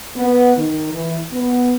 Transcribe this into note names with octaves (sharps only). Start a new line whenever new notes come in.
B3
D#3
E3
B3